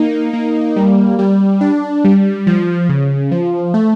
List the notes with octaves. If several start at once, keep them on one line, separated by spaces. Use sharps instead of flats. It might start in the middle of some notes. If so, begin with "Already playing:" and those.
Already playing: A#3 D#4
A#3
G3
G3
D4
G3
F3
C#3
F3
A3